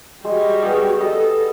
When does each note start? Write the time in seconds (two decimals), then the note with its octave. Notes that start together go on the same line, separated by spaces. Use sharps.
0.25 G3 G#3 F#4
0.63 B3 G4 G#4
1.01 A4 D#5